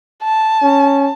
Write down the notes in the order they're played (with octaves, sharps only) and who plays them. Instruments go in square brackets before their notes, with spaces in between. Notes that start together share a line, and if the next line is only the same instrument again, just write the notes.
[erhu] A5
[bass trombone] C#4